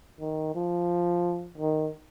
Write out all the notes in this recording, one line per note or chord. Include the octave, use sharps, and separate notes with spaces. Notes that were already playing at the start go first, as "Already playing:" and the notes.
D#3
F3
D#3